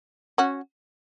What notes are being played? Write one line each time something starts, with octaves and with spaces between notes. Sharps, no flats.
C#4 F#4